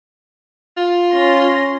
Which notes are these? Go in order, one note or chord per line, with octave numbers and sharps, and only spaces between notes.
F4
C#4 C6 A#6